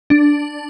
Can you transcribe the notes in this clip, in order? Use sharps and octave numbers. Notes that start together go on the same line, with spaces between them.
D4